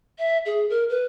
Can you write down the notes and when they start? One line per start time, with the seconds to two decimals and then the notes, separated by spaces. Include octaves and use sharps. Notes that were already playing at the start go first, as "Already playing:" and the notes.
0.19 E5
0.46 G#4
0.69 A#4
0.89 B4